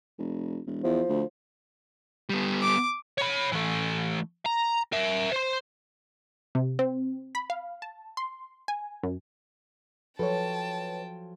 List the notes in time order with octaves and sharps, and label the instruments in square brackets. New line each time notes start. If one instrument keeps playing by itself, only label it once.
[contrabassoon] F1
E1
[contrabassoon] E2 [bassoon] F3
[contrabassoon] D2
[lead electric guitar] G3 B3
[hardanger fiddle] D6
[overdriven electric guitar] C#5 B5
E3 A3
A#5
A#4 E5
C5 C6
[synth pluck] C3
C4
B5
F5
A5
C6
G#5
F#2
[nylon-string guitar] F3 F#3 A4 [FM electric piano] B4 C#5 [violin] G5 A5